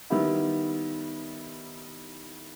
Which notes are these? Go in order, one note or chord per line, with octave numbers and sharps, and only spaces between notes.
D#3 G3 B3 E4